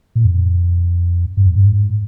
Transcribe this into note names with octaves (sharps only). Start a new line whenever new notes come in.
A#2
F2
G2
F2
G2
G#2